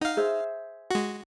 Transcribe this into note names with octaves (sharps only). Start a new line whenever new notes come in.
D#4 F5 F#5
G#4 C5 E5
G#3 F#4